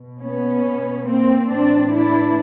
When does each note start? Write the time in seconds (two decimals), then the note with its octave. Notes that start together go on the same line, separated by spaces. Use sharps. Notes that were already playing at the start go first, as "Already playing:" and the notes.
Already playing: B2
0.20 B3 C#4
1.05 A#3 C4
1.48 A2 E3 C4 D4
1.91 D4 E4